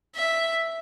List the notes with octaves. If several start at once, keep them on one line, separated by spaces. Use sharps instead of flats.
E5